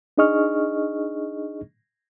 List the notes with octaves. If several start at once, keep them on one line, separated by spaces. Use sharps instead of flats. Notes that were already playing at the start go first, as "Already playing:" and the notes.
D4 D#4 G#4 D#5 C#6 F6